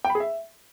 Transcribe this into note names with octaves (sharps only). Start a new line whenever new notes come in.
G5
B5
G#4
E5